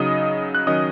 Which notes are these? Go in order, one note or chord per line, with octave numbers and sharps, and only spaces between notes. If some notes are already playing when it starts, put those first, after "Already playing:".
Already playing: C#3 F#3 D#4 D#5 D#6
F#6
D#3 F#3 C#4 D#5 D#6